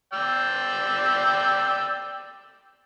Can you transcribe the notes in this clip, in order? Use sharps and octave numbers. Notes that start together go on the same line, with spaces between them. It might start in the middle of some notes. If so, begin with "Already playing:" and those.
D5 G5 E6